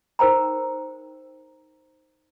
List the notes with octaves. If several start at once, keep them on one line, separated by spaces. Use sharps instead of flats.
D#4 A#4 C5 G5 A#5